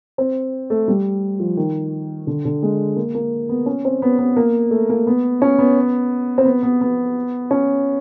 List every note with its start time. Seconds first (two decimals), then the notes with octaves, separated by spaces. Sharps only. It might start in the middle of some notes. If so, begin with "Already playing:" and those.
0.18 C4
0.70 A3
0.88 G3
1.40 F3
1.57 D#3
2.27 D3
2.45 D3
2.63 G#3
2.96 A#3
3.15 A#3
3.49 B3
3.66 C#4
3.85 C4
4.02 B3
4.18 B3
4.36 A#3
4.71 A3
4.89 A#3
5.07 B3
5.42 C#4
5.59 B3
6.38 C4
6.45 B3
6.63 B3
6.81 B3
7.51 C#4